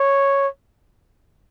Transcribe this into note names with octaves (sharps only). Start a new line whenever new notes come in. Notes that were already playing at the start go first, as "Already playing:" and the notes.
Already playing: C#5